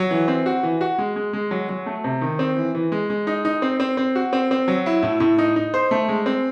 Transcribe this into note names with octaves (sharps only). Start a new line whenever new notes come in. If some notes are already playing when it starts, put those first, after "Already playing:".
Already playing: F#3
E3
C4
F#4
E3
F#4
G#3
G#3
G#3
F#3
F#3
A3
C3
D#3
C4
E3
E3
G#3
G#3
D#4
D#4
C4
C4
C4
F#4
C4
C4
F#3
E4
A2
A2
D#4
D#4
C5
A3
G#3
C4